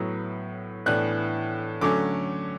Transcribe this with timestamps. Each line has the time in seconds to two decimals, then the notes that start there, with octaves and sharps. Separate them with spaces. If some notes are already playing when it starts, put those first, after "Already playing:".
Already playing: A2 F#3 B3
0.86 A2 E3 B3 D4 F#6
1.81 D3 F#3 A3 C#4 D6